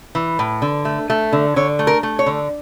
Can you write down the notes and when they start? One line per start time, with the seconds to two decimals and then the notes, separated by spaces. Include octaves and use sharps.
0.15 E3
0.39 A2
0.62 D3
0.85 A3
1.10 A3
1.33 D3
1.56 D3 C#5
1.79 A3
1.87 A#4
2.03 A3
2.19 C#5
2.26 D3